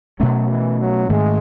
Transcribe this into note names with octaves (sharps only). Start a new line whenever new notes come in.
B2 F#3 A3 C#4
E3
F#3
G#2 D#3 G#3 A3